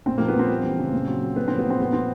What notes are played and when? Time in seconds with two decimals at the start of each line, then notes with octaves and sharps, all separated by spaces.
0.06 A#2 C4
0.18 F3 A#3
0.28 B3
0.35 F3 C4
0.50 G3
0.64 E3
0.78 C#3
0.92 A#2
1.07 F#3
1.22 F#3
1.36 A#2 B3
1.48 F3 C4
1.59 B3
1.65 F3
1.70 C4
1.79 A#2 B3
1.93 F3 C4